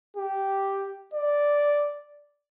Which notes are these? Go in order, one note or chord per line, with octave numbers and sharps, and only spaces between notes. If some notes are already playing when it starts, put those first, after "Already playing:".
G4
D5